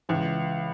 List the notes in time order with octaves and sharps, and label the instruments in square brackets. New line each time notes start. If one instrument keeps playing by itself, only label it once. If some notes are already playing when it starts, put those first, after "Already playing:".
[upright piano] C#2 [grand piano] E3